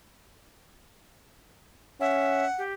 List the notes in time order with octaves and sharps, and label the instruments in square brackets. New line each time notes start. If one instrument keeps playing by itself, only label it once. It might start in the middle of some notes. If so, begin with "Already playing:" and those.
[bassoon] C#4 [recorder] E5 [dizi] F#5
[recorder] G4